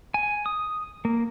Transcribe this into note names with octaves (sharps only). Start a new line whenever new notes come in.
G#5
D#6
A#3